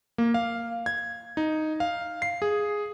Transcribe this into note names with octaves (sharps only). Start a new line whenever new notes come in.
A#3
F5
G#6
D#4
F5
C7
G#4